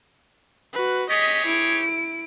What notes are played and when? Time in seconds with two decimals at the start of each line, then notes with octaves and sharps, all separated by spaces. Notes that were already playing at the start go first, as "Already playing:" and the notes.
0.73 F#4 B4
1.10 G4 G#4 C#5 D#5 B6
1.46 E4 D7